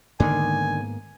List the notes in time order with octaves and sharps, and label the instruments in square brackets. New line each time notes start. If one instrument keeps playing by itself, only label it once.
[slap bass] G#2 A#3 B3 [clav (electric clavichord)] D3 D#3 [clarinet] G#5